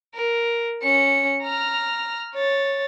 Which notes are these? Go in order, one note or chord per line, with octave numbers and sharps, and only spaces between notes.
A#4
C#4 C#7
A#5 F6
C#5 A6